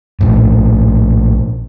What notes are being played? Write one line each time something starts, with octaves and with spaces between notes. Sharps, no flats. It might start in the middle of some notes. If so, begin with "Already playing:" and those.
A#1 A2